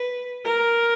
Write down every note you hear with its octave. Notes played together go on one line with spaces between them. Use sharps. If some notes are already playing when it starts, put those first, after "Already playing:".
Already playing: B4
A#4